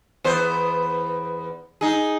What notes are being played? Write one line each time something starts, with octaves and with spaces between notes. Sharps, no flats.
E2 B3 C5
D#4 G#4